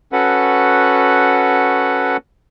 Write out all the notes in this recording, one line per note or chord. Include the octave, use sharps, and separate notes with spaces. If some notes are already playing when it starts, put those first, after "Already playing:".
C#4 F#4 A4 B4 F#5